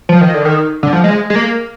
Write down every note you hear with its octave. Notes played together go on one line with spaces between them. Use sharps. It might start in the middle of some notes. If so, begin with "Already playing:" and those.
F3
D#3
D3
D#3
D3
F3
G#3
G#3
A#3